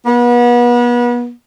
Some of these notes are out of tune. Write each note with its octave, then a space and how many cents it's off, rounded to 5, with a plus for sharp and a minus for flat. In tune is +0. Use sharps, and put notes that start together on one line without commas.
B3 -35